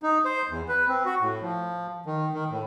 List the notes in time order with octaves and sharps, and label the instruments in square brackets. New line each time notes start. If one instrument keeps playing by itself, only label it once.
[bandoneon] D#4
C5
E2
B4
C4
F#4
A2
F3
D#3
D#3
A2